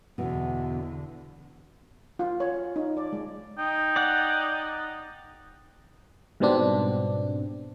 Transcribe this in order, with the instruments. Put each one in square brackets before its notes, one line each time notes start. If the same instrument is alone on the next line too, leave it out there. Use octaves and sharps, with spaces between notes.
[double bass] E2 D3 [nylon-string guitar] B2 E3
[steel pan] F4
C#5
F5
D#4
D5
G#3
[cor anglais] D#4 [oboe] G5
[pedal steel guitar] D5 F#5
[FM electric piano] G#2 B2 G3 B3 C4 D4